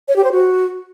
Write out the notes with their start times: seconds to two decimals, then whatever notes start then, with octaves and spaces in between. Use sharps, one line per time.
0.08 C#5
0.16 G4
0.24 C5
0.32 F#4